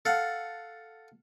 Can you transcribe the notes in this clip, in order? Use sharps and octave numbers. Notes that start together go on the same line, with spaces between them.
A4 F5 F#5